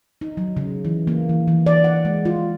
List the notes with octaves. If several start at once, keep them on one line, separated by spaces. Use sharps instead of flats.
D#4
F#3
C#3
E3
A#3
E3
E3
D5
F#5
G#3
F4